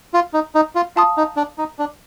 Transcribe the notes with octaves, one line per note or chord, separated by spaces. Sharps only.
F4
D#4
D#4
F4
F4 F5 A5 D#6
D#4
D4
D#4
D4